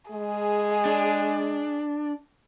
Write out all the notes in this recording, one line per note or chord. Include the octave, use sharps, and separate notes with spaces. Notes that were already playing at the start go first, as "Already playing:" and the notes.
G#3 G#4
D4